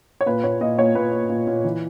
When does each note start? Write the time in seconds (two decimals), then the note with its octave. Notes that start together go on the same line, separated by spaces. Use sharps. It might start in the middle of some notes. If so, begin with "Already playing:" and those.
0.21 C#5
0.26 A#2 B4
0.44 A#2 C#5
0.61 A#2 D#5
0.78 A#2 C#5
0.95 A#2 B4
1.12 A#2
1.29 A#2
1.47 A#2
1.64 E3